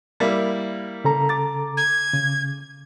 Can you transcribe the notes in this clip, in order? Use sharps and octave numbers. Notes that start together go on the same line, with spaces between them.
G3 A#3 E4
C#3 A4 A#5
D6 A6
G#6
C#3